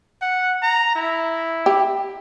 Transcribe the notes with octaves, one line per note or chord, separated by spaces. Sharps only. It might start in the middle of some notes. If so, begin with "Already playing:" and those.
F#5
A#5
E4
G4